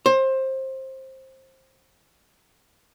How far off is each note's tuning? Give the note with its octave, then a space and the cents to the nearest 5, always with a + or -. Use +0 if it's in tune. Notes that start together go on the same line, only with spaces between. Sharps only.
C5 +20